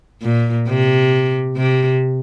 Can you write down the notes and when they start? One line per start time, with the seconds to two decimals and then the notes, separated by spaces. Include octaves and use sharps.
0.22 A#2
0.67 C3
1.57 C3